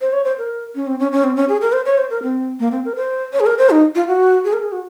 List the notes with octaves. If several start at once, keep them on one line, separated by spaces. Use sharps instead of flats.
C5
C#5
C5
A#4
C#4
C4
C#4
C#4
C4
C#4
G#4
A#4
C5
C#5
C5
A#4
C4
A#3
C4
A#4
C5
C#5
G#4
A#4
C5
D#4
F4
F#4
G#4
A#4
G#4
F#4